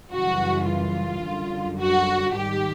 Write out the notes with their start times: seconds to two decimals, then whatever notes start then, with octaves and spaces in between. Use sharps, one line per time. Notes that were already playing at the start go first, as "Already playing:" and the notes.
0.11 F#2 C#3 E3 G3 F#4
0.67 F4
1.24 F#2 D3 G3
1.79 F#4
2.34 G#2 D#3 G3 G4